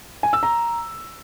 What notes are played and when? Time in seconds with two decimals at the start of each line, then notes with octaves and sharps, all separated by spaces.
0.23 G#5
0.33 E6
0.43 A#5